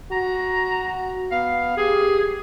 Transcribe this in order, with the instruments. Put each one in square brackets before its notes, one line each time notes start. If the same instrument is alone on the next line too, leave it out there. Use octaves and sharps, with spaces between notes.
[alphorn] F#4 [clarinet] A#5
[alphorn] B3 [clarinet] F5
[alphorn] G4 [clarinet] G#4